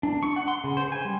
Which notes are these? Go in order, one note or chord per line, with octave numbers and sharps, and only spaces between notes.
D4
C#6
F#5
C6
C#3
C5
G#5
G3